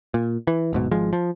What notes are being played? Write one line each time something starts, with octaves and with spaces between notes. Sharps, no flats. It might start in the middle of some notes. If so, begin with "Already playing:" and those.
A#2
E3
D1 G#2 B2
G#1 F3 G#3
F3